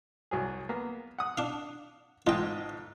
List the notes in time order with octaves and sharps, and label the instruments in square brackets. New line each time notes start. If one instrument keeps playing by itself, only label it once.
[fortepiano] C2 F#3 G#4
A#3 B3
F#5 D#6
[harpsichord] D4 F5
[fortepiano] A1 G#2 D#5 [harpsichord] F4 G5